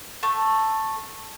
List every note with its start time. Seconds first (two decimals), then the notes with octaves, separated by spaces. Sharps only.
0.23 A3